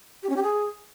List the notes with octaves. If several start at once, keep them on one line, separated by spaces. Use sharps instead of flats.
G4
C#4
G4
G#4